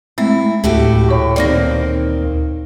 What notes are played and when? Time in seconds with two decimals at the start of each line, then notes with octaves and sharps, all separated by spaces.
0.18 G#3 A3 C4 E4
0.64 D2 A2 F#4 G4
1.09 A#2 C#5 C#6
1.36 D#3 A#3 C4 D5 A#6